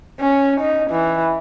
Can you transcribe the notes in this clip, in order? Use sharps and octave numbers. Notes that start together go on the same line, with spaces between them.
C#4
D#4
E3